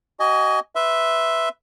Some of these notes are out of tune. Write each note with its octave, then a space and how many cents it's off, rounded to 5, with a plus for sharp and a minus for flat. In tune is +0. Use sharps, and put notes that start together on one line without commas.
F#4 +40 D#5 +0 G#5 +0
B4 +0 E5 +0 C6 +0